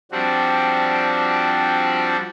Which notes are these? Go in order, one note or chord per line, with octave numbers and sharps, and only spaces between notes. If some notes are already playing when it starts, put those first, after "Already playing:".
F3 G3 C4 D4 F#4